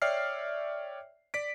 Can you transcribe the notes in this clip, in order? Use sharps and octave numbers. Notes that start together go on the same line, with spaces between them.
C#5 D5 E5 G5 F6 C7
D5 B6 D7